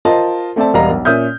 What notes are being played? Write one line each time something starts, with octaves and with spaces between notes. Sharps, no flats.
F4 A#4 C5 D#5 A5
A3 C4 D5 E5 A5
E1 G3 A#4 D#5 F5 A#5
B1
A#2 C#4 E5 D#6 F6 G6